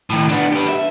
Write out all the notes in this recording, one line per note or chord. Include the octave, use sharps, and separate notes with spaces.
A2 D#3
B3 D4
G4 B4
E5